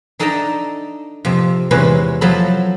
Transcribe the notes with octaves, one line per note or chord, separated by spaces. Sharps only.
D4 D#4 A4 E5 G5 A#5
F2 C3
E2 C3 G#3 C#4 E4 B4
F3 F#3 A4 B5